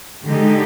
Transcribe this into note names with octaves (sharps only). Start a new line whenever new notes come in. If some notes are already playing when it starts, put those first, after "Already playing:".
D3 G#3 D#4 G4